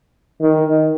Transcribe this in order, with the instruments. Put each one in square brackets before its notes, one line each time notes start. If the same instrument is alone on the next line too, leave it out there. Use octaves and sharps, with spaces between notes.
[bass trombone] D#3